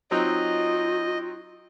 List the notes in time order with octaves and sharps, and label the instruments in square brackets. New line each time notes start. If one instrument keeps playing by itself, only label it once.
[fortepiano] F#3 C4 D#4 [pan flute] F4 [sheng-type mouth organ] D#5